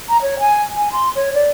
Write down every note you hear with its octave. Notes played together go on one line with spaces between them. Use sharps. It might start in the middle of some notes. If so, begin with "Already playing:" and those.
A#5
C#5
G#5
G#5
C6
C#5
D5